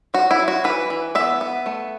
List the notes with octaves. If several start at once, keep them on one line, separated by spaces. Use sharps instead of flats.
F#3 F#4
E4
F#3
F#4
E3 B4
E3
B3 E5
B3
A3